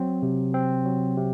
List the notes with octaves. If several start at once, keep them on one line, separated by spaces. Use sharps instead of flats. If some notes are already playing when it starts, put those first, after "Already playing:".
Already playing: F#3 C4
C3
C4
F#3
C3